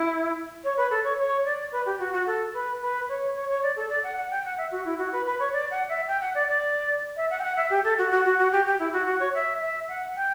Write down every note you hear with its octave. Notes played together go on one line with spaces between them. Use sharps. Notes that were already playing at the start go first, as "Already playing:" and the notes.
Already playing: E4
C#5
B4
A4
C#5
C#5
D5
B4
G4
F#4
F#4
A4
B4
B4
C#5
C#5
C#5
D5
A4
D5
F#5
F#5
G5
F#5
E5
F#4
E4
F#4
B4
B4
C#5
D5
F#5
E5
G5
F#5
D5
D5
E5
F#5
G5
F#5
E5
G4
A4
F#4
F#4
F#4
F#4
G4
G4
E4
F#4
F#4
C#5
E5
E5
F#5
G5